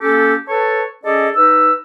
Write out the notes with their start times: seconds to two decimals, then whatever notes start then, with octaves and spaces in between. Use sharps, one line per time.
0.01 A#3 C#4 G4 A4
0.47 A4 B4 C#5 A5
1.04 C#4 G#4 A4 D5 D#5
1.34 D#4 B4 E6